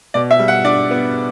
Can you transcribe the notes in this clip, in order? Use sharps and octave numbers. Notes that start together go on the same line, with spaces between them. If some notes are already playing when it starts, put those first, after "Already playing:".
B2 D5
E5
G3
F#5
D4 D5
B3